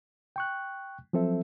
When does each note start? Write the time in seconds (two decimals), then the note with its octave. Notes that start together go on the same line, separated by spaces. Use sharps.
0.36 G5 C#6 F#6
1.13 F3 F#3 C4 A4 E5